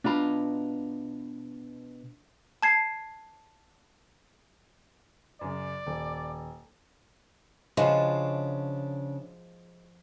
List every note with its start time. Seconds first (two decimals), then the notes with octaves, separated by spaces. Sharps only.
0.04 B2 D4 F4 A#5 B5
2.63 A5 G#6 C7
5.41 F#2 C#3 D5
5.87 D#1
7.77 C#3 F3 G#3 D4 F#4